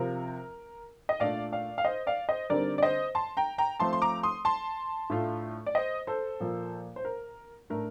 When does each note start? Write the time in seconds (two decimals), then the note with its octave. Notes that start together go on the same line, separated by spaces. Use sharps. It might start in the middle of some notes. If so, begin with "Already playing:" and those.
Already playing: C3 F3 C4 F4 A#4
1.09 D#5
1.20 A#2 A3 D4 F4 D5 F5
1.52 D5 F5
1.78 F5
1.85 C5 D#5
2.07 D5 F5
2.28 C5 D#5
2.50 D3 G3 C4 D#4 A#4 D5
2.78 D5
2.83 C5 D#5
3.15 A5 C6
3.37 G5 A#5
3.58 G5 A#5
3.80 F3 A3 C4 A5 C6
3.93 C6
4.02 A#5 D6
4.23 C6 D#6
4.45 A5 C6
5.10 A2 A3 D4 F4
5.66 D5
5.75 C5 D#5
6.07 A4 C5
6.40 A#2 F3 A#3 F4
6.96 C5
7.05 A#4
7.70 A2 A3 D4 A#4